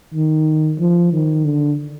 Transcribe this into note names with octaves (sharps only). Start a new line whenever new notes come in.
D#3
F3
D#3
D3